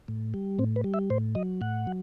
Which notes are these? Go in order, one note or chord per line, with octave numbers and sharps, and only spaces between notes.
A2
G3
A2 C4
B4
G3
E5
A2 C5
F#3 D#5
A2 F#5
F#3